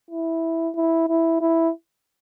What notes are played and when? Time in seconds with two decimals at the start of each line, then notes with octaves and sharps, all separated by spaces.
0.10 E4
0.75 E4
1.08 E4
1.41 E4